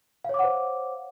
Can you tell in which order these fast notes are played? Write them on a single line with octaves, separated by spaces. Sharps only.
F5 C#5 D6 F#5 C5